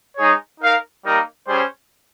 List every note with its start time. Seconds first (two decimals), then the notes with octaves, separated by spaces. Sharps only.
0.16 G#3 D#4 G#4 C#5
0.61 D#4 A#4 F5
1.04 G3 A#3 D#4 A#4
1.48 G3 C#4 G#4 C5